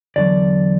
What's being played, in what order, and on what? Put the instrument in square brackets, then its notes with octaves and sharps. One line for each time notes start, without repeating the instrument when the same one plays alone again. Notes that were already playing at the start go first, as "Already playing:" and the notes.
[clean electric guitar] E2 D3 F#3 D5